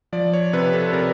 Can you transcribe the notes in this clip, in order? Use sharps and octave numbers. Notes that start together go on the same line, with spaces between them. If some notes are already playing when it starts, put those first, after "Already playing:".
F3 D5
C#5
C3 B4
A4
C3 A#4